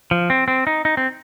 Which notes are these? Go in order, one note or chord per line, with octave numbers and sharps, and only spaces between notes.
F3
C4
C4
D#4
D#4
C4